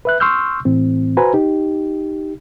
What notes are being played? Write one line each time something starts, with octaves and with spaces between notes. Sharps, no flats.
B4 E5 F#6
C6 C#6 E6 F6 G6
A2 E3 C4
F#4 B4 C5 G#5 A#5
D#4 G4